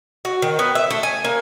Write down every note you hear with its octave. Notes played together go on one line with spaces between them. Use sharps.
F#4
D#3
B3
E5
A3
G#5
A#3